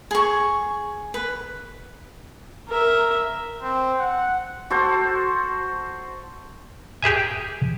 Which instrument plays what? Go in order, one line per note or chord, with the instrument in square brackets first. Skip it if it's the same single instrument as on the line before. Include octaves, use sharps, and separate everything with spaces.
[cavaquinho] G#4 C#6
B4
[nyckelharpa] A#4 E5
[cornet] C4
F#5
[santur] F#4 A4 C5
[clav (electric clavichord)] G4 G#4 E5 G#5